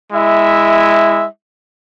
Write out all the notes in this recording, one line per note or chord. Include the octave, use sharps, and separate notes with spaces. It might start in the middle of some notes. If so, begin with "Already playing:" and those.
G#3 E4 E5